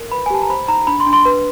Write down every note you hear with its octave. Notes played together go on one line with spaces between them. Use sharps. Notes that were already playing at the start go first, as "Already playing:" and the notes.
Already playing: A#4
B4 B5
G#5
G4 A5
A#5
C5 B5
D#4 A#5
D4 B5
C6
D4
C6
B4